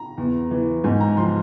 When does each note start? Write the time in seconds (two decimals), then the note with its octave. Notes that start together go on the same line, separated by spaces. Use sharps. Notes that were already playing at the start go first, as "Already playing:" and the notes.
Already playing: A#5
0.18 E2
0.51 E3
0.84 G#2 G#5
1.01 A#5
1.17 F3 C6